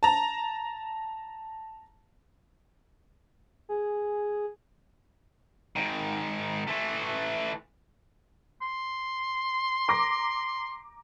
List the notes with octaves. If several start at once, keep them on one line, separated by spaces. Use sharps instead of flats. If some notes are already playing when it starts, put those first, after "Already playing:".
A5 A#5
G#4
G#2 D#3
E3 A3
C6
A#5 D6 A#6